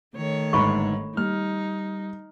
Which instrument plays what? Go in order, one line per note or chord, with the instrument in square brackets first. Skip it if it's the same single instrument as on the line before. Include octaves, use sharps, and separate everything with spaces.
[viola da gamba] D#3 A3 C#5
[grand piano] G1 G#2 [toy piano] B5 C#6
[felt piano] G3 [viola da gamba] D#4 [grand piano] F6